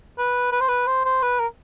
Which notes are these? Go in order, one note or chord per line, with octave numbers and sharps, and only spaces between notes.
B4
B4
C5
B4
C5
C5
B4
A#4